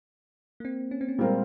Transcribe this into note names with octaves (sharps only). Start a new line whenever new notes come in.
A#3
C4
C#4
C4
C#4
A#2 G3 G#3 C4 F4 A#4